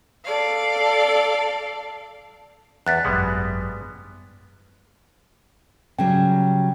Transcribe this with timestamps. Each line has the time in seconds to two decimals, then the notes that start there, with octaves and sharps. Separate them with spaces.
0.24 A4 D5 F5
2.87 E2 F#6 A6 B6
3.05 G#1 F#2 G3 G#3 B3
5.99 C#3 F#3 G3 G5